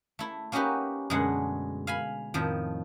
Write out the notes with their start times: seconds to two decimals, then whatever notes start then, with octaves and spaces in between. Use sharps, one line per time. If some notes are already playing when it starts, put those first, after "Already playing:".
0.19 A3 E4
0.52 A#3 C#4 D#4 F#4 G4 B4
1.10 F#2 B2 D3 G#3 A3 F#5
1.87 F5 G#5 B5
2.34 F2 A2 D#3 F3